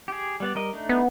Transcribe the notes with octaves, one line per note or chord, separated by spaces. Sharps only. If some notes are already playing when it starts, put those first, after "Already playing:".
G4 G#4
G3 B3 D5
G3 A#4 D#5
A3 D4 D#4
B3